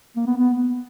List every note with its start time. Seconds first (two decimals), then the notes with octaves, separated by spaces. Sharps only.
0.16 A#3
0.26 B3
0.36 B3